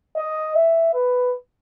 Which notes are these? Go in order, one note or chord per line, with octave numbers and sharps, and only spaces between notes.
D#5
E5
B4